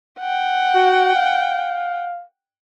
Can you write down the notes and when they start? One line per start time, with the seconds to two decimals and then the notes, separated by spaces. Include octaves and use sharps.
0.20 F#5 G5
0.75 F#4
1.15 F5